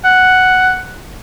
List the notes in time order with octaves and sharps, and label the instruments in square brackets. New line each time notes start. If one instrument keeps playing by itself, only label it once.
[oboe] F#5